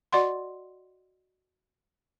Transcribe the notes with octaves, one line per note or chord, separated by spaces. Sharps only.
F#4 D5 D#5 F#5 C6